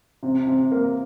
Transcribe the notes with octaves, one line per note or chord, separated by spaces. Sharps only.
C3
C3
A#3